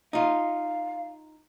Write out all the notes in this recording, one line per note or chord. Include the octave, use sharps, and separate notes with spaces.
D#4 F4 F5